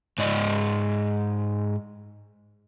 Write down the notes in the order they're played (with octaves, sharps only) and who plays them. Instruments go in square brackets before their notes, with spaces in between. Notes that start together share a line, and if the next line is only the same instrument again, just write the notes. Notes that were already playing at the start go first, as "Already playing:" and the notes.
[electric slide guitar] G#2 D5 D#5